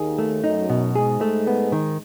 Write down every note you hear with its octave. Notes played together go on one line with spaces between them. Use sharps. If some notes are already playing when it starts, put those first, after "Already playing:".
Already playing: D#2 D#3 G#4
A3
F#2 F#3 D#4
B2
G#2 G#3 G#4
A3
B3
D#3